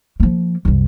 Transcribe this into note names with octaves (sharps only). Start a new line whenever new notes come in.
F3 A#3
C2 F#2